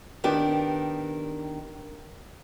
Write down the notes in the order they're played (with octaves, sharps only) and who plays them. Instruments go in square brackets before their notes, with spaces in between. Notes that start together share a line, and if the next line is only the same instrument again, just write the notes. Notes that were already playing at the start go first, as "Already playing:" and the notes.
[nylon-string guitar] D#3 B3 D4 G4